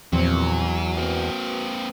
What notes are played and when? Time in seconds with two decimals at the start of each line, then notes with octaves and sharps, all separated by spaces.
0.13 E2 A#2 F3 F#3 C4
0.97 A#3 C4 F#4 B4